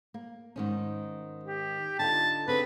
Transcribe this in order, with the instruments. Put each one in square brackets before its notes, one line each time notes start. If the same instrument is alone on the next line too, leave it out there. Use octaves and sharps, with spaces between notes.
[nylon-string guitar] A#3
G#2 D#3 C#4
[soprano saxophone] G4
[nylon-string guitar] D3 D#4 F4 [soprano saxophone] A5
[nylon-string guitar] D3 C4 G#4 [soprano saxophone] B4